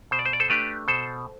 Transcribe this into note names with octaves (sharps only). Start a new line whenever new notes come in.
B2 C5
D5
C5
D5
A4 C5
A3 D4 G4 B4
B2 A4 C5